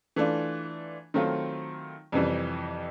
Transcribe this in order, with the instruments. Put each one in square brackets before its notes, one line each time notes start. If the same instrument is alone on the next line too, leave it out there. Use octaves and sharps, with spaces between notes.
[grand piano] E3 A3 D4 F4
D#3 F#3 A3 C4 F4
F2 C3 E3 G3